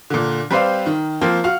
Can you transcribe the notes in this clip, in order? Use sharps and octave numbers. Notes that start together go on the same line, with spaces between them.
A#2 D3
G3 C4 B4 C5 D5 F5
D#3
F3 A#3 C4 F4
F#4 F5 F6